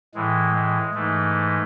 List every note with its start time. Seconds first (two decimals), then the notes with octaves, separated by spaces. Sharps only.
0.15 A2 E3 G#3
0.55 G#3
0.94 G#2 E3 G#3 A3